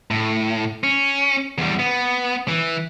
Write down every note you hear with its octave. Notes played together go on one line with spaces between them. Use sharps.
A2
C#4
E2 G3
B3
E3